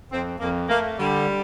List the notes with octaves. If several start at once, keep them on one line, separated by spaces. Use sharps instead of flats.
F2 C4
F2 A#3
A3 A#3
D3 G3